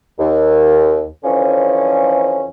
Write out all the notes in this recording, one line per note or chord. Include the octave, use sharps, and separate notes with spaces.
D#2
F2 D3 E3 F3 C#4